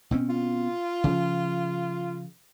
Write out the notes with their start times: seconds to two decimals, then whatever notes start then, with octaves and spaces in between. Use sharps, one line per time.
0.11 B2 C4 C#4
0.29 F4
1.04 C#3 F3